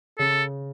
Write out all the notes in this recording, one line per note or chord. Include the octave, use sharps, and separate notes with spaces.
C#3 A4